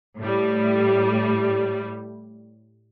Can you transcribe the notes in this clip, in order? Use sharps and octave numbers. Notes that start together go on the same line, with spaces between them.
A2 G3